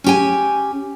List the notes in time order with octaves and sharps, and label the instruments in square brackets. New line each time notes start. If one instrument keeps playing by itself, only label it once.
[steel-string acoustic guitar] C#4 G4 G#5